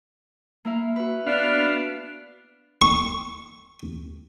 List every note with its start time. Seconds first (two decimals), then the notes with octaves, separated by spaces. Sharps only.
0.65 A#3 E4 F5
0.96 F#4 B4
1.27 B3 D4 F5
2.82 C#6